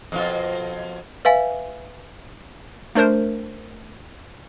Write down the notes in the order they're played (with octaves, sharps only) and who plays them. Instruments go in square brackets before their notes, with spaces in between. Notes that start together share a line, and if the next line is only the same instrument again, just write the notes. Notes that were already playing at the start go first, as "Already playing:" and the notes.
[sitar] F2 B2 F4
[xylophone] B4 E5 F5 G#5
[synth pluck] A3 D4 A#4 C5